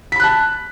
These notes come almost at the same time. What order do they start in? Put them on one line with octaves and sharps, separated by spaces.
B6 B5 F#6 A5